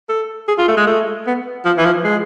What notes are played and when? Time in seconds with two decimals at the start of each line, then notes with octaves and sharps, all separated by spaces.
0.09 A4
0.48 G#4
0.58 F4
0.68 A3
0.77 G#3
0.87 A3
1.27 B3
1.65 F3
1.78 E3
1.85 F3
2.04 G#3